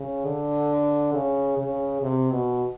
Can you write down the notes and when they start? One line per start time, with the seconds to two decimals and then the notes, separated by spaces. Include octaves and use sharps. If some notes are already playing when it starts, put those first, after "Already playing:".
Already playing: C#3
0.25 D3
1.14 C#3
1.58 C#3
2.02 C3
2.32 B2